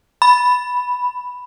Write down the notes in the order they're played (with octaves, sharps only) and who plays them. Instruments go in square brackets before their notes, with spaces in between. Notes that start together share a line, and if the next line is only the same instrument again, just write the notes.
[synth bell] B5